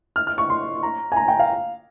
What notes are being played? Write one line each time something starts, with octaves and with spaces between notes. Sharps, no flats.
F6
F6
C#6
C6
A#5
G#5
A#5
G5
F5